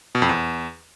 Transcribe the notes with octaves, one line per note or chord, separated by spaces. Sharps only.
B2
F2
E2